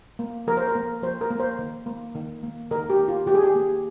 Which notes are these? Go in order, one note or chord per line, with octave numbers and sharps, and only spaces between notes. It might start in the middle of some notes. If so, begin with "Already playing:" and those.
A#3
F3 A#4
C5
A#4
A#3
F3 C5
A#4
A#3
C5
D#3
A#3
D#3
A#3
D#3 A#4
G4
A#3
F4
D#3 G4
G#4
G4
A#3